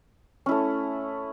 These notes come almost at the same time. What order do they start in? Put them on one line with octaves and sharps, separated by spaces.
C#4 E4 A3